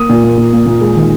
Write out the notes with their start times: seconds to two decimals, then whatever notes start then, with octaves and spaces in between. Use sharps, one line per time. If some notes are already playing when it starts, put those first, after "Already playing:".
Already playing: A#3 D#6
0.09 A#2
0.24 A#3
0.38 A#2
0.53 A#3
0.66 A#2
0.81 G#3
0.95 D#3